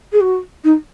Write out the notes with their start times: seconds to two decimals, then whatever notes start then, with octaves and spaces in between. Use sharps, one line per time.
0.12 G#4
0.20 F#4
0.64 D#4